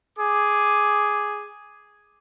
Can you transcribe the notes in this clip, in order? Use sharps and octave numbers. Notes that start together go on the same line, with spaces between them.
G#4 D6